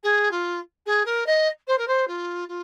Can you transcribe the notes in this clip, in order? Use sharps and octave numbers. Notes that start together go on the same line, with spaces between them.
G#4
F4
G#4
A#4
D#5
C5
A#4
C5
F4
F4